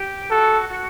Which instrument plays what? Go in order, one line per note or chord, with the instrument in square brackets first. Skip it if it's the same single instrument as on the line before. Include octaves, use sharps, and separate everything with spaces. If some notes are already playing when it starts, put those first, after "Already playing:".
Already playing: [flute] G4
[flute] F#4 [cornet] A4
[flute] F#4